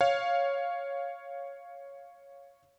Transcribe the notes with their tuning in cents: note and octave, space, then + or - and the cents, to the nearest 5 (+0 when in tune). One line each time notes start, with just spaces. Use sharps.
C#5 +0 F5 +0